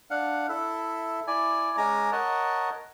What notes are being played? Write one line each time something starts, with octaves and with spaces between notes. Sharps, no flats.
D4 F5 F#5
E4 A4 E5
E4 D5 G#5
G#3 C#4 G#5 A#5 D6
A#4 C#5 D#5 F#5 A5